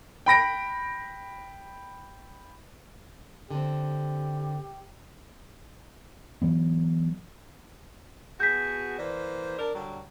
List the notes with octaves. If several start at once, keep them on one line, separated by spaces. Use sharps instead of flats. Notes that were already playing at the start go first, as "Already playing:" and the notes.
G5 B5 A#6 D7
D3 C4 G4
E3 F#3 B3
B2 F#4 G#4 G6 B6
E3 A#3 C5 D5
D4 A#4
D3 F#3 G3